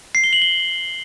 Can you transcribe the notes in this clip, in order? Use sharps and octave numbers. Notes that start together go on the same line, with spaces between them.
C7
G7
F#7
G7